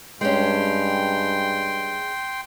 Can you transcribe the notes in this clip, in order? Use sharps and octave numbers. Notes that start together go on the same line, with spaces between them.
G2 G#3 C#4 G5 C6